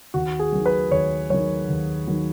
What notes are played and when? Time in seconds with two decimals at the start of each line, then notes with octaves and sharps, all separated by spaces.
0.14 D#2 F#4
0.39 G#4
0.52 D#3 F#3
0.66 B4
0.91 D#2 C#5
1.30 D#3 F#3 C#5
1.68 D#2
2.07 D#3 F#3